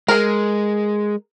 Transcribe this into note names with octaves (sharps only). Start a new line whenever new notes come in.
G#3 G#4 A#4